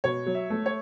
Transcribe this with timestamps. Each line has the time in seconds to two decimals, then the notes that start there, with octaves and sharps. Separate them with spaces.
0.04 B2 C#5
0.26 F#3
0.35 E5
0.50 A3
0.66 C#5